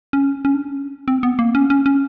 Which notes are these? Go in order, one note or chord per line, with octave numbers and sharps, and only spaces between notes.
C#4
C#4
D4
C#4
C4
B3
A#3
C#4
C#4
C#4